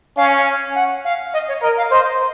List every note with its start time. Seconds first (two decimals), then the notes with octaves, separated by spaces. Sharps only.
0.17 C#4 F5
0.75 F#5
1.04 F5
1.33 D#5
1.48 C#5
1.62 A#4 D#5
1.77 F5
1.91 C5 D#5